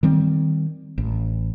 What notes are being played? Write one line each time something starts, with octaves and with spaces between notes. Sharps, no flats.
D#3 G3 C4
A1